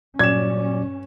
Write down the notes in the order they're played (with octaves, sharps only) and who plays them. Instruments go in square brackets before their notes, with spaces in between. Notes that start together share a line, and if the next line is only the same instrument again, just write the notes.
[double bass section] G2 C#4 [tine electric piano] A#2 F#3 D5 [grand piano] G#6 E7